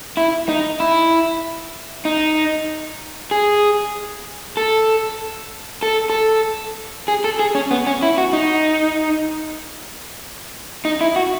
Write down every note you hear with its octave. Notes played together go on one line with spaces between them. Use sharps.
E4
D#4
E4
D#4
G#4
A4
A4
A4
G#4
A4
G#4
C#4
B3
C#4
E4
F#4
D#4
D#4
E4
F#4